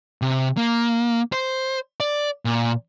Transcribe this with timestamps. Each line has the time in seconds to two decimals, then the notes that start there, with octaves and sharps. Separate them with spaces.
0.22 C3
0.57 A#3
1.32 C5
2.00 D5
2.45 A#2